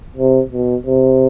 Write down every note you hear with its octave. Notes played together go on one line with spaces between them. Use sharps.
C3
B2
C3